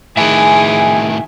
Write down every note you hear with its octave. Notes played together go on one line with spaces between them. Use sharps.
A2 D#3 G#4 E5 G#5